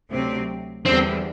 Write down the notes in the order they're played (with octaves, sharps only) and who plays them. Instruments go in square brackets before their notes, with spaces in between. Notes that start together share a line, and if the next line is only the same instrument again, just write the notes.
[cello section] D2 C3 F#3 C4
[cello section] E2 D3 G3 [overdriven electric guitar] C4